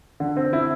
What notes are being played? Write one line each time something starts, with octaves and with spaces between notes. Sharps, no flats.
D3
C4
E4